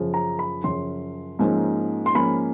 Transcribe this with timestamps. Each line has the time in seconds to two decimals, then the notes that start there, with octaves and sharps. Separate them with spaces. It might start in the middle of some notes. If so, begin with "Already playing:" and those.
Already playing: F#2 C#3 F3
0.14 A#5
0.39 B5
0.64 F#2 C#3 F3 C6
1.39 G#2 F3 A#3 C#4
2.06 C6
2.15 G#2 F3 A#3 C#4 B5